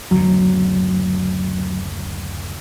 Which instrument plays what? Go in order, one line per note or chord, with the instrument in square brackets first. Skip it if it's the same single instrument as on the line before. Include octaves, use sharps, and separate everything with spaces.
[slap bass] F#1 D2 B2 [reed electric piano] F#3